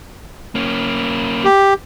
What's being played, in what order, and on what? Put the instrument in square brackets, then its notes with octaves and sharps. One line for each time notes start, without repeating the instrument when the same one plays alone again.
[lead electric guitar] A#3 C#4
[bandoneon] G4